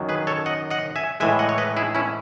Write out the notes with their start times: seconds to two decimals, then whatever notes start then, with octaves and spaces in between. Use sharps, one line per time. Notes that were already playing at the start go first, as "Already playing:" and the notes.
Already playing: F#2 D#3 F#3
0.09 G#4 B4
0.27 A4 C#5
0.46 D#5 F#5
0.70 D#5 F#5
0.96 E5 G#5
1.20 A2 E3 G#3 E5 G#5
1.39 D#5 F#5
1.49 C#5
1.58 B4 D#5
1.77 E4 G#4
1.95 C#4 E4